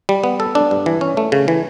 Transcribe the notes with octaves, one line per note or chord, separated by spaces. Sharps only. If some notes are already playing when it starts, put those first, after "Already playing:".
G3
B3
A4
D4
G2
E3
C#4
A3
C#3
E3